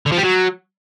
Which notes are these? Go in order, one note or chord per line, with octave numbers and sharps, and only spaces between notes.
D3
F3
G3
F#3